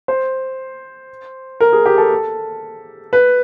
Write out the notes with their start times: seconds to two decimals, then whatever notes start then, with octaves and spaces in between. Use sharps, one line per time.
0.08 C5
1.60 A#4
1.73 G#4
1.86 G4
1.98 A4
3.13 B4